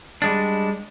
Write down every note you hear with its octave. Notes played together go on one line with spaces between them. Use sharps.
G3 G#3 D4